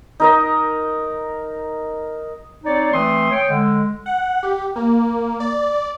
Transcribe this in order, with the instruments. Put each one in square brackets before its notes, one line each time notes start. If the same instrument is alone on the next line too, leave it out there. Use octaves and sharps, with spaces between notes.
[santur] D#4 A#4 D#5
[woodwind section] C4 D#4 C#5 D5
E3 A3 C4 C6 D#6
C#5 G5
D3 G#3
[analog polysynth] F#5
G4
A#3
D5